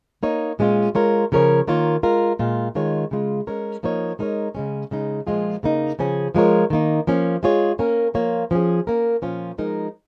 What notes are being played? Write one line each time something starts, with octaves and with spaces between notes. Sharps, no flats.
A#3 D#4 C#5
A#2 G#3 C#4 F4
G#3 F4 A#4 C#5
C#3 F3 C#4 A#4 C#5
D#3 A#3 F4 C#5
G#3 F4 A#4
A#2 G#3 F4
D#3 G#3 F4 C#5
C#3 G#3 F4
G#3 C#4 A#4 C#5
F3 A#3 D#4 C#5
G#3 D#4 A#4 C#5
C#3 G#3 C#4
C#3 G#3 D#4
A#2 F3 G#3 F4 G#4
C#3 A#3 D#4
C#3 F3 C#4 G#4
F3 G#3 F4 A#4 C#5
D#3 A#3 D#4
F3 A#3 C#4 F4
G#3 F4 G#4 C#5
A#3 C#4 A#4
F3 A#3 F4 C#5
F3 C#4 G#4
A#3 C#4 A#4
A#2 F3 C#4 F4
F3 G#3 D#4 A#4